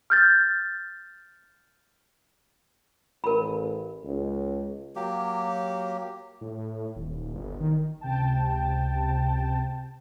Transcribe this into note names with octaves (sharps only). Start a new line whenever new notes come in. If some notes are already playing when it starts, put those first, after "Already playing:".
F6 G6 A6
A1 A#4 B5
C#2
F#3 A#3 G4
A2
D#1
G1
D#3
C#2 C3 G5 A5